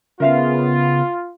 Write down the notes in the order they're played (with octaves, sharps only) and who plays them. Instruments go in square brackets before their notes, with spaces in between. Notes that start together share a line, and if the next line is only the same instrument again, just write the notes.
[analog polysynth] C#3 B3 [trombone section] F4 [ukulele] A#4 E5 F5